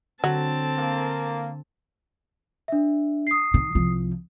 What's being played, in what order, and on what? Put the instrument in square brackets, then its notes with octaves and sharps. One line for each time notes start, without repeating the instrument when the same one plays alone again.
[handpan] D3 [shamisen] F#3 [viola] C4 A5
[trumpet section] A#3
[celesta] D4 E5
D#6 C7
[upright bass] D#3
C2 F3